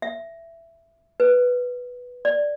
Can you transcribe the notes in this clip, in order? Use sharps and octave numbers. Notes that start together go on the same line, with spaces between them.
E5
B4
D5